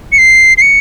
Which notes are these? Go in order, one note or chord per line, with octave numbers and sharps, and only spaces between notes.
C#7
C7
C7
C#7